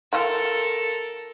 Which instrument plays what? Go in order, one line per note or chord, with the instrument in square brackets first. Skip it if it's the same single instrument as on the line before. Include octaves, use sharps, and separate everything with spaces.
[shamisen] E3 F4 G5 [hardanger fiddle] A4 A#4